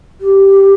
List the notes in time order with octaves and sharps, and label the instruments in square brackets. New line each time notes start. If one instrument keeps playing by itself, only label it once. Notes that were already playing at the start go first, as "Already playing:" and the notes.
[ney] G4